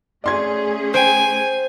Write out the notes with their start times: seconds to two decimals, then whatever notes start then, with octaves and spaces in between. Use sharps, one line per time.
0.24 A3 C#4 G#4 D5 C6 G#6
0.94 C5 G5 G#5